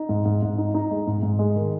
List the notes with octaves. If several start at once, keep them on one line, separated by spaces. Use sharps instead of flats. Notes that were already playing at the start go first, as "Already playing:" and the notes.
Already playing: D#4
G#2
G#2
G#2
D#4
D#4
G#3
G#2
G#2
G#3
D#3